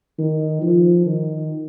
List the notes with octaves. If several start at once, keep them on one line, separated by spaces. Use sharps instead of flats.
D#3
F3
D#3